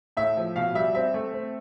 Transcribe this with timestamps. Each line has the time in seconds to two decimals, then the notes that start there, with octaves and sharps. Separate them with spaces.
0.17 A2 E5
0.37 F3
0.56 B2 F5
0.75 G3 E5
0.95 C4 E5
1.14 A3
1.34 C4